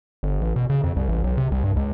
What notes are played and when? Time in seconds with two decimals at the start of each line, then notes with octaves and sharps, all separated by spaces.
0.23 G1
0.41 A1
0.56 B2
0.70 C#3
0.84 F2
0.96 C2
1.09 A1
1.24 B1
1.38 C3
1.52 C2
1.64 G2
1.76 C#2